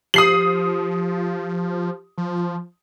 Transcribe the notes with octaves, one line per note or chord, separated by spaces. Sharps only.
F3 G4 D#6 C7 F#7
F3